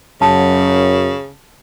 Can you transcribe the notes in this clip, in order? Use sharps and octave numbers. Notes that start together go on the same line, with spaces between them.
F#2 C#3 A5